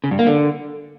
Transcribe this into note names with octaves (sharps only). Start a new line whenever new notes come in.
C#3
G2
A#3
D3